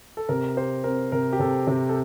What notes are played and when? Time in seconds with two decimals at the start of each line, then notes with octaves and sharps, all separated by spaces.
0.17 A4
0.29 C3 A#4
0.57 G4 C5
0.84 C4 A#4
1.12 C3 A#4
1.33 G4
1.40 C3 A4
1.67 C3 G4
1.89 A4